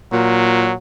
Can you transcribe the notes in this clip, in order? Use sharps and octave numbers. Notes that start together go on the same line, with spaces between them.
A#2 F#3